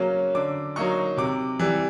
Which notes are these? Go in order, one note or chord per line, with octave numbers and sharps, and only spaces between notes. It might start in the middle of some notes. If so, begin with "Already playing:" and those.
Already playing: C#3 F#3 A#3 C#4
D3 D6
F#3 A#3 D#4 C#6
C3 D6
E3 G3